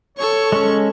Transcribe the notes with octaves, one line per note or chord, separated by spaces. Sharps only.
A4 C#5 C#6
G#3 C#4